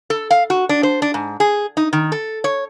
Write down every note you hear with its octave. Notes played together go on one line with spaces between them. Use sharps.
A4
F5
F#4
D4
C5
D4
G#2
G#4
D#4
D#3
A4
C#5